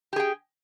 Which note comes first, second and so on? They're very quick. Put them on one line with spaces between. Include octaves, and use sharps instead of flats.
G4 G#4 G5